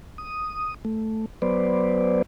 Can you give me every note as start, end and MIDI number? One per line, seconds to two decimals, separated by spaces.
0.18 0.74 87
0.85 1.26 57
1.42 2.22 54
1.42 2.22 59
1.42 2.22 71
1.42 2.22 72
1.42 2.22 74